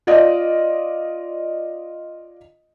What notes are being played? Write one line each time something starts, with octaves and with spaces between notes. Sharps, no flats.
F4 D5 D#5